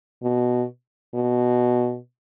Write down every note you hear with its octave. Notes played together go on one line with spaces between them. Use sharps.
B2
B2